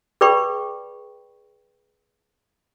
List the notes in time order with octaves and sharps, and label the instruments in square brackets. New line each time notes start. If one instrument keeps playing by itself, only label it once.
[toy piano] G#4 B4 D5 G5 B5 C#6